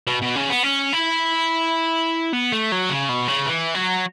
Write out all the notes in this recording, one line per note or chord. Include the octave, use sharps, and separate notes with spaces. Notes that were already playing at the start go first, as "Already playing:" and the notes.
B2
B2
C#3
B3
C#4
E4
B3
A3
F#3
C#3
B2
C#3
E3
F#3